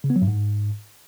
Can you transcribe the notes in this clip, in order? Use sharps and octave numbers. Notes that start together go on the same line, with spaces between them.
C#3
B3
F#3
G2
G#2